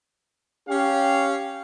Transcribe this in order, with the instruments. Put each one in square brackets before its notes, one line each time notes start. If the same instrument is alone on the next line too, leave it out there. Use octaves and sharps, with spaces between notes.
[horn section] C#4 F5 [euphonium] G4